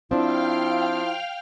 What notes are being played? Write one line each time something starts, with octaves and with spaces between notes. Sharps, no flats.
F3 C4 D4 E4 F5 G5 F6